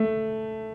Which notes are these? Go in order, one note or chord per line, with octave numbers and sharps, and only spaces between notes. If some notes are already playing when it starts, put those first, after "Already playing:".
Already playing: A3